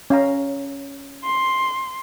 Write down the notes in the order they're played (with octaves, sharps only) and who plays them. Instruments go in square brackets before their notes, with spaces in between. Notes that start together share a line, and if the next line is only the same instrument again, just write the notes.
[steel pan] C#4 F5 A#5
[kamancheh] C6